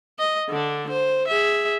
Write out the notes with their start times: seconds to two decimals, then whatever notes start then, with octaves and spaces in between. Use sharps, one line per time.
0.19 D#5
0.49 D3 D4
0.90 C5
1.28 G#4 E5